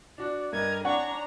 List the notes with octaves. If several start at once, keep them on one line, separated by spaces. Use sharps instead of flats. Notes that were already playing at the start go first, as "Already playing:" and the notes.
D4 F#4 D5
G2 D4 A#4 D#5 G#6
D4 C#5 D5 F#5 G#5 A#5 C#6